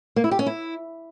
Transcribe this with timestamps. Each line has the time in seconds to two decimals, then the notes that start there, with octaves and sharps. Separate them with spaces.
0.16 A#3
0.24 E4
0.31 G4
0.39 C#4
0.46 E4